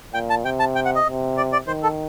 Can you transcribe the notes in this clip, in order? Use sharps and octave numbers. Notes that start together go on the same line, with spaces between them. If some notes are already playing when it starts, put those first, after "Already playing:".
A#2 G5
A5
C3 G5
A5
G5
F#5
D#5
C3
D5
D5
D#3 C5
A4